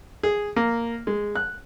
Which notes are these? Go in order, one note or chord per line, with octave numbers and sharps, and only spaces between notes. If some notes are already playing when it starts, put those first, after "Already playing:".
G#4
A#3
G#3
F#6